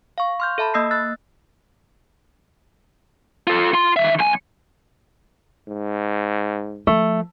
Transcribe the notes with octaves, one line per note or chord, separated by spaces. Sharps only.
F5 C#6
C6 F6 G6
A4 E5 A5 B5
A#3 D#5 D#6 E6 A#6 C7
E6 F#6 A6
F4 A4
F4 C6
D#3 E5
B1 G#5
G#2
F3 A3